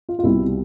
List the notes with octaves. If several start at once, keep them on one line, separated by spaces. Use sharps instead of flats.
F4
F4
C2 B2 G3 E4